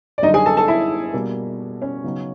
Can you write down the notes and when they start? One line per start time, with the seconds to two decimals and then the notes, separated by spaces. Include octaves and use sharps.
0.18 D5
0.23 F#2 D3 G3 D#4 D#5
0.34 G#4 G#5
0.46 A4 A5
0.57 A4 A5
0.68 E4 E5
1.13 B2 G3 A#3 D4
1.82 C#4 C#5
2.04 C#3 F#3 B3 D#4